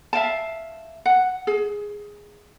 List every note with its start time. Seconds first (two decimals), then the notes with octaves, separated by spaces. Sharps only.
0.13 E5 F5 G5 A5
1.05 F#5
1.47 G#4